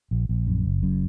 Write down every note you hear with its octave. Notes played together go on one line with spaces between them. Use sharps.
A#1
A#1
F#2
F#1
F#2